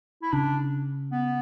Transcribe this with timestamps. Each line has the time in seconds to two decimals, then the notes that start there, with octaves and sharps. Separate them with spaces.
0.23 E4
0.32 C#3 D4
1.12 B3